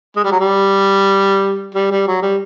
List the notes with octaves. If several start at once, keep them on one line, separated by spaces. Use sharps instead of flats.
G#3
G3
F#3
G3
G3
G3
F#3
G3